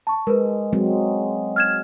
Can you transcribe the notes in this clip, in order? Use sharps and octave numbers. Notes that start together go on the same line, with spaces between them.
A5 C#6
G#3 A#4 B4
F#3 G#3 C4
F6 G#6 E7